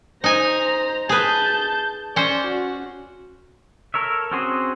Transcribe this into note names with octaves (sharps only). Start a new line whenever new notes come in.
D#4 C5 G#5 A#5
G#4 B4 A5 G6
C#4 C5 D5
F#4
A4 A#4 C#5 E5
C4 C#4 F#4 G#4 C5